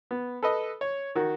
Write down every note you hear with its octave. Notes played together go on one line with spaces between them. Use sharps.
B3
A4 B4 D#5
C#5
D#3 F#4